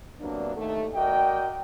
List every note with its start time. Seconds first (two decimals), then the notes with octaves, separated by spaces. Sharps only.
0.20 C3 F#3 A#3 B3 D4
0.56 D#2 A3
0.94 F#4 A#4 D5 D#5 G5